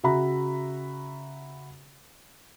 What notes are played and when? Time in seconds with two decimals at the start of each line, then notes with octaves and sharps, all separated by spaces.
0.03 C#3 F#4 E5 A#5 B5